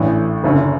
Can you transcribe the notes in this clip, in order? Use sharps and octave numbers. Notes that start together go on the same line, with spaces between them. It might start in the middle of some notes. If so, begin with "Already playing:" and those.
Already playing: A1 A2 E3 D4
F#1 F#2 D3